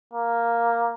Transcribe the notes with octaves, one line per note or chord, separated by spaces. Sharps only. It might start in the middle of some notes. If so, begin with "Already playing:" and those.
A#3